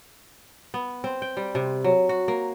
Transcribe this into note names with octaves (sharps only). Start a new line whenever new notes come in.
B3
C4
G5
G3
C3
F#3
F#4
A#3